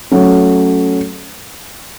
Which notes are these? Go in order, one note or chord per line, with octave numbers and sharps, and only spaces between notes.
F#3 A3 C#4